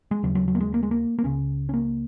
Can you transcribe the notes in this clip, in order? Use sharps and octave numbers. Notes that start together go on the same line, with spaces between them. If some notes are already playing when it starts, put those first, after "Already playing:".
G#3
D#2 C#3 F#3
F#3
F#3
A#3
G#3
A#3
G#3
A#3
A#3
C#2 C#3 C#4
C#4
A#3